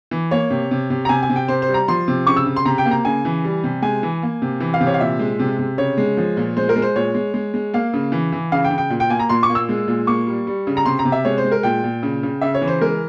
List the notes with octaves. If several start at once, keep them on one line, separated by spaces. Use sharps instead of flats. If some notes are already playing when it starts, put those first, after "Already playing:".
E3
A#3 C#5
C3
C3
C3
A#5
C3 G#5
G#5
C3
G5
C3 C5
C5
G3
A#5
F3 C6
C3
C#3 C#6
E6
C#3
C6
C3 A#5
G5
A#3
A#5
C#3 G#5
E3
G3
C3
G#3 G#5
E3
A#3
C3
E3
F5
C3
C#5
F5
A#2 E5
G#3
C3
C3
C#3 C#5
G#3
F3
A#2
G#3 C5
A#4
G#3
C5
A#2 C#5
G#3
G#3
G#3
A#3 F5
C#3
E3
E3
C#3 F5
G5
C#3
G5
A#2
G5
A#3 G#5
A#5
A#2 C6
C#6
A#3
E6
G#3
A#2
A#3 C#6
G3
G3
C#3
A#5
C3 C6
A#5
C3
E5
G#3 C#5
C5
G#3
A#4
A#2 G5
A#2
C#3
C#3
C#3 E5
C#5
E3
C5
G#3 A#4